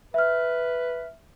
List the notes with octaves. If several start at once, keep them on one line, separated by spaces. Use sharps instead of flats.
B4 E5 F6